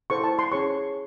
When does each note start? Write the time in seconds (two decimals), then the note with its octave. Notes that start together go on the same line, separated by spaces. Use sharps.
0.10 E4 A4 C5 C#6
0.24 A5
0.39 C6
0.52 C#4 G#4 C#5 C#6